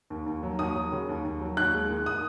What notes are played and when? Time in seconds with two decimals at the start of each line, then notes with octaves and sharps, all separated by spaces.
0.10 D#2
0.26 D#2
0.43 F#3
0.59 D#2 D#6
0.76 F#3
0.92 C#3
1.09 D#2
1.25 D#2
1.41 F#3
1.57 D#2 F#6
1.74 G#3
1.90 D#3
2.06 D#6